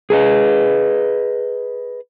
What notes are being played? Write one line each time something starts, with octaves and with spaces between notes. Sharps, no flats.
G#4 B4 D#5